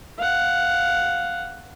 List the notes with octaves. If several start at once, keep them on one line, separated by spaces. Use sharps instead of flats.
F5 F#5